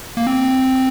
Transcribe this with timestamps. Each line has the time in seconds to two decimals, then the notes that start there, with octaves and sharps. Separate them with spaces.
0.17 A#3
0.27 C4